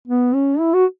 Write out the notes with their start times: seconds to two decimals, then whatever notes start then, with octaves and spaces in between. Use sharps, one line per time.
0.08 B3
0.34 C#4
0.59 E4
0.74 F#4